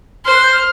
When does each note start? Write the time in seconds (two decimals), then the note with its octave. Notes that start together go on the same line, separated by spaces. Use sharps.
0.24 C5 F6
0.34 F#6
0.43 G6
0.52 F6